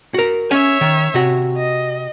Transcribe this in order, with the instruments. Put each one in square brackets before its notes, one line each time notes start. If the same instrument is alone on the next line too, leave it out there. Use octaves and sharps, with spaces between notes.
[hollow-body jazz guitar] F#4 A#4
[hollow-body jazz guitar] C#4 G#5 [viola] C#5 E5
[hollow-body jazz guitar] D#3
C3 F#4
[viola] D#5